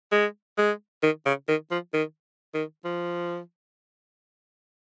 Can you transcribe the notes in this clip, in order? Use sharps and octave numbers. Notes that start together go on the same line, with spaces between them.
G#3
G#3
D#3
C#3
D#3
F3
D#3
D#3
F3